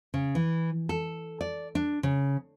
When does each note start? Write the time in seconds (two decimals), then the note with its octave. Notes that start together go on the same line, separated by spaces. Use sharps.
0.14 C#3
0.35 E3
0.89 A4
1.41 D5
1.75 D4
2.03 C#3